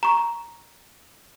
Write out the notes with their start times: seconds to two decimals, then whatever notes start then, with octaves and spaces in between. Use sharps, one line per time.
0.03 A#5 C#6